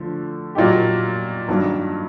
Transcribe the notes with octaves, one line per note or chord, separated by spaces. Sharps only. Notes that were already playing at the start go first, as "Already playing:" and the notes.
Already playing: D3 F3 A3
A#2 F#3 A#3 D#4 G4
G2 D#3 F#3 A#3 D4